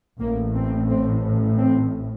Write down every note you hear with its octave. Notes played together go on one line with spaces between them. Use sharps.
A1 A2 A#3
C4
C4
C4